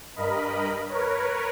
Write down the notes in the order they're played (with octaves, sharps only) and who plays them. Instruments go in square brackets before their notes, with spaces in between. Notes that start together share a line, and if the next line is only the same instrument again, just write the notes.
[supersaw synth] G2 A#4 D#5 B5
A#4 B4 C#5